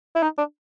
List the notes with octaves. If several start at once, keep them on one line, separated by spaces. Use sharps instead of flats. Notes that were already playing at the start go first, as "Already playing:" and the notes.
E4
D#4
D4